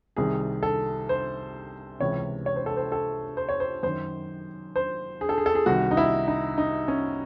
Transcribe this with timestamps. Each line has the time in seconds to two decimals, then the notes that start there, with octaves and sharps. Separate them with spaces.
0.17 C2 C3 D#3 G#4
0.63 A4
1.09 C5
2.00 C#2 C3 E3 C#5
2.46 C#5
2.56 C5
2.66 A4
2.77 C5
2.92 A4
3.37 C5
3.49 C#5
3.60 C5
3.83 F#2 D#3 C5
4.76 C5
5.21 G#4
5.29 A4
5.38 G#4
5.46 A4
5.55 G#4
5.66 C2 C3 D#3 F#4
5.91 D#4
5.97 E4
6.28 D#4
6.58 D#4
6.88 C#4